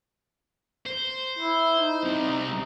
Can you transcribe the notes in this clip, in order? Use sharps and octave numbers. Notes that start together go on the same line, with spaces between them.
C5
E4
D#4
C2 C3